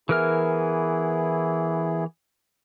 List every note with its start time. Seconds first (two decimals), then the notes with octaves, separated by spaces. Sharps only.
0.09 E3 B3 E4 G#4 A#4 F6